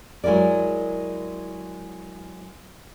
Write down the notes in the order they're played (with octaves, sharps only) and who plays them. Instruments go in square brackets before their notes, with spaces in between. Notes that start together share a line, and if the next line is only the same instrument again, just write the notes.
[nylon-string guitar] F#3 G#3 E4 A#4 D5